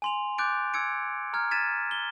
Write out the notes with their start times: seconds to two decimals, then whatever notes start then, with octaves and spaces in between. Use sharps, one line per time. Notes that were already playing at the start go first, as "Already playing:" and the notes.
0.02 G#5 C6 F7
0.38 D6 F#6 G6 A6 D7
0.74 E6 G#6 C#7 D7
1.33 A#5 F6 G#6
1.51 G#6 A6 B6 D#7 E7
1.91 G7